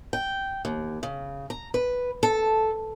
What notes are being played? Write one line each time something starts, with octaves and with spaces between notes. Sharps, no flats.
G5
D#2
C#3
A#5
B4
A4